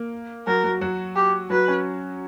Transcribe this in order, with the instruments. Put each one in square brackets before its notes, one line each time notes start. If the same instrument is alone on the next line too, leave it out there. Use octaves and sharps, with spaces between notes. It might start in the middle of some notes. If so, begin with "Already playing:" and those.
Already playing: [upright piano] A#3
[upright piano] F#3 F#4 [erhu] A#4
[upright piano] F#3 F#4
F#3 F#4
[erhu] G4
[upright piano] F#3 F#4 [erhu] B4
[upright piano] C#4